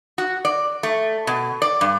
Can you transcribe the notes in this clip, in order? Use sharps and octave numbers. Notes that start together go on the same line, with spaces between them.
F#4
D5
A3
B2
D5
G2